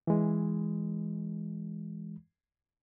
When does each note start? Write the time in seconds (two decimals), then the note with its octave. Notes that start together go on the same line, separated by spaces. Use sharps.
0.07 E3 G#3